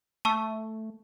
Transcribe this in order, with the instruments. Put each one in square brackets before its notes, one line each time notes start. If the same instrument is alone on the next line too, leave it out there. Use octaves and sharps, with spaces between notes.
[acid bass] A3 [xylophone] A5 C#6 E6